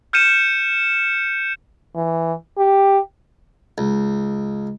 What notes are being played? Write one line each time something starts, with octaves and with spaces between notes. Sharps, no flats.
F6 G6 C#7 D#7 E7
E3
G4
C#2